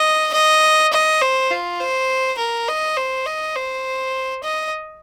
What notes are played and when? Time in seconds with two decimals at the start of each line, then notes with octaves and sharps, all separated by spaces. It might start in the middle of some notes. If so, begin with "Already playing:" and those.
Already playing: D#5
0.34 D#5
0.93 D#5
1.21 C5
1.51 F4
1.80 C5
2.39 A#4
2.68 D#5
2.97 C5
3.26 D#5
3.56 C5
4.43 D#5